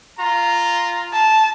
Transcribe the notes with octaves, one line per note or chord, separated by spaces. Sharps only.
F4 A#5
A5